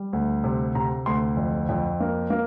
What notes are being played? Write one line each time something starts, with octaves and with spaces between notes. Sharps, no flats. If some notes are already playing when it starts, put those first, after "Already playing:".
Already playing: G3
D2
C3
C3 A#5
D2 C6
F2
F2
A#3
A#3